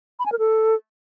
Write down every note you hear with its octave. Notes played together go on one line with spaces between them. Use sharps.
B5
G#5
A#4
A4